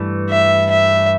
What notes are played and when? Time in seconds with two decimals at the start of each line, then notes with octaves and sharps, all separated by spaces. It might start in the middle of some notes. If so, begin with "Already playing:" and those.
Already playing: G2 E3 A3
0.30 E5
0.71 E5